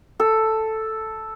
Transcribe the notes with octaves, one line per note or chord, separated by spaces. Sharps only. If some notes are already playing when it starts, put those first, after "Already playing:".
A4